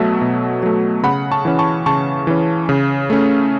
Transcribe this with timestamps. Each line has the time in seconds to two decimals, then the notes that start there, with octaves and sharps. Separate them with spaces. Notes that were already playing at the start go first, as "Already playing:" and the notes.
Already playing: B2 F#3 A3 E5 A5
0.21 B2
0.63 F#3 A3
1.03 C#3 F#5 B5
1.31 A5 C#6
1.45 E3 C#4
1.59 A5 C#6
1.86 C#3 A5 C#6
2.27 E3 C#4
2.69 C#3
3.10 A3 C#4